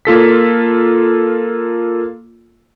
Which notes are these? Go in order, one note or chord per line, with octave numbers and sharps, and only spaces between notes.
A#3 F4 A4 B6